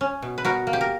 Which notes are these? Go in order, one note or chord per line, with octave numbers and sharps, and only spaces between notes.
C#4
B2
B4
B2 F#4 A#4
A#3
G4
A#4